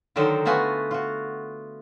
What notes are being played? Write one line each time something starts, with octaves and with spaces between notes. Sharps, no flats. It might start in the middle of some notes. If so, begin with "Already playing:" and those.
D3 D#3 F#3 A4 A#4 C5
A3 B3 F4 F#4 G#5
F4 F#4